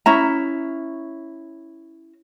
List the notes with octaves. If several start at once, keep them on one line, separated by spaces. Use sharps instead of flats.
C#4 E4 A#5